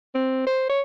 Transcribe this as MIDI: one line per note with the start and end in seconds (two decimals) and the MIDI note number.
0.15 0.43 60
0.47 0.67 72
0.69 0.81 73